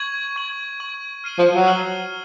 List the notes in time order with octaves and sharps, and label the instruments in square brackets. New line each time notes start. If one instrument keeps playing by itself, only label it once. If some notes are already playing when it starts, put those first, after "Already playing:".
Already playing: [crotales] C#6 G#6 D#7 F#7
C#6 G#6 D#7 F#7
C#6 G#6 D#7 F#7
F6 C7 D#7 F#7
[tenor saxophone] F3
F#3
[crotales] F6 C7 D#7 F#7